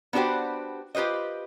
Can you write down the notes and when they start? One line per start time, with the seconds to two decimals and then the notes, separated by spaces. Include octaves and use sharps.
0.13 B3 D4 F#4 G4 C5
0.95 F4 G4 B4 C5 D#5